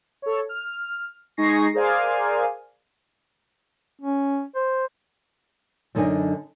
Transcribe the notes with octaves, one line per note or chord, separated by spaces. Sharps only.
A4 C#5
F6
G#3 D#4 G#5 C#6 A#6 C7
G#4 A#4 C5 D5 F5 G#5
C#4
C5
F#2 D3 D#4 D#5 G#5